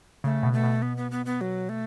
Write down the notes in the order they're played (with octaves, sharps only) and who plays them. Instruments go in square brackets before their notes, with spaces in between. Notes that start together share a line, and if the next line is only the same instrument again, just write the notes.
[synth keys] C#3 [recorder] A3
[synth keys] B2
[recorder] A3
[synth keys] B2
[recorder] B3
B3
B3
B3
F#3
A3